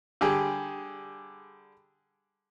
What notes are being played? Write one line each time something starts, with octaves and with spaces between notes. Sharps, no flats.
D3 G3 G4 G#4